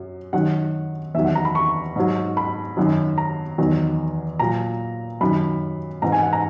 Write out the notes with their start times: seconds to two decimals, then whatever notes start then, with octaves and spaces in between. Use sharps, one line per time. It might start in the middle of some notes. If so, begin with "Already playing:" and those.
Already playing: F#2 F#3
0.33 F#2 D#3 F#3 F#5
1.15 E2 D#3 F#3 E5
1.25 F#5
1.35 A#5
1.45 B5
1.55 C#6
1.96 G#2 F#3
2.37 B5
2.77 F#2 D#3 F#3
3.18 A#5
3.58 E2 D#3 F#3
4.39 A#2 F#3 A#5
5.21 F#2 D#3 F#3 B5
6.02 G#2 E3 A#5
6.12 G#5
6.23 F#5
6.33 A#5